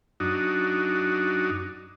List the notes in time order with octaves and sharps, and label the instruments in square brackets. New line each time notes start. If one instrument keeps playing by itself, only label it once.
[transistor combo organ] F#2 D4 D#4 F#4